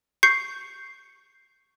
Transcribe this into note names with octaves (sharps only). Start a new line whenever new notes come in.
C#6 G6 C7 C#7